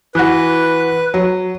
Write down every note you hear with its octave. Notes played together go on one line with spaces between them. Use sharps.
E3 F#4 B4
F#3